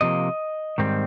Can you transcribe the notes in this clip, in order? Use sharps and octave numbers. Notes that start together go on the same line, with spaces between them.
C3 F3 A#3 D#5
G#2 D#3 G3 C4